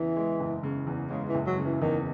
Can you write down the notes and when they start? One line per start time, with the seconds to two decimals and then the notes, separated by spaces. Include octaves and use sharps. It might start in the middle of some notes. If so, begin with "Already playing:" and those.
Already playing: E2 C#3 E3
0.17 G#3
0.40 F#1
0.63 C#3
0.87 E2
1.11 C#3 G#3
1.29 E3
1.35 F#1
1.46 F#3
1.58 C#3
1.64 E3
1.82 E2 D#3